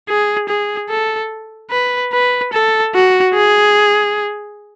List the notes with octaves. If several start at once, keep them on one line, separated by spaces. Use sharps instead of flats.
G#4
G#4
A4
B4
B4
A4
F#4
G#4